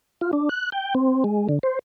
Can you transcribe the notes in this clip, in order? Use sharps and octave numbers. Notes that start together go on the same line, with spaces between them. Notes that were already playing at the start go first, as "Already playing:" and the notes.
F4
D4
F#6
G5
C4
G#3
D3
C5